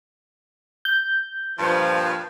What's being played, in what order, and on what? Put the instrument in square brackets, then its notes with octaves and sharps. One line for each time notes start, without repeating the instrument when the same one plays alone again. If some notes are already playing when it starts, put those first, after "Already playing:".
[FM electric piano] G6
[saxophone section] G2 A#2 F3